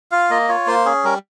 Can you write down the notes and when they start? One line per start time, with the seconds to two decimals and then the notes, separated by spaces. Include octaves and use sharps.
0.11 F4 F5
0.30 A#3 D#5
0.48 F4 C#5
0.67 A#3 C5
0.85 C#4 G#4
1.04 G3 A#4